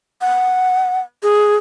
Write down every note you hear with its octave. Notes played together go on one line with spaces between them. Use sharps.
F#5
G#4